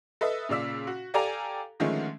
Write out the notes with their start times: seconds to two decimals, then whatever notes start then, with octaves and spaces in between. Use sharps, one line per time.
0.21 A4 B4 D#5 E5
0.49 A#2 C#3 D5 E6 B6
0.87 F#4
1.14 G4 A4 D5 F5 G#5 A#5
1.80 D3 D#3 F3 G#3 A3 C#4